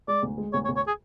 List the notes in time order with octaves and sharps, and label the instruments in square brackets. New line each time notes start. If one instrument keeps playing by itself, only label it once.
[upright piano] G#3 [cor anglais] D5
[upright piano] D2
G#3
[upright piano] D2 [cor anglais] C#5
[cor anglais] C#5
[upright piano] D2
[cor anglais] C#5
G#4